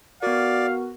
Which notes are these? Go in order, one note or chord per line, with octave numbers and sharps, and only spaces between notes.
B3 F#4 A#4 D5 F5